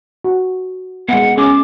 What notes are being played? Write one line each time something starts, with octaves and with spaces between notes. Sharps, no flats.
F#4
G#3 B3 F#5
C#4 G#4 D6